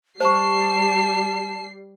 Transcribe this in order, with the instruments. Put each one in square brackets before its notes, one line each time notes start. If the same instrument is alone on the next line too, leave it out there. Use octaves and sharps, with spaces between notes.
[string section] G3 C7 [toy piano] C5 C#6 [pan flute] A5